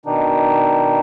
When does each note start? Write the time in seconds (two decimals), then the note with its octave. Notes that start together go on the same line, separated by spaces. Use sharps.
0.06 B2 D#3 D4 D#4